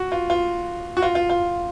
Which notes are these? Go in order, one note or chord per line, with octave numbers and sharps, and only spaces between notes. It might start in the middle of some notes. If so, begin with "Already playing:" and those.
Already playing: F#4
F4
F4
F#4
F4
F4
F4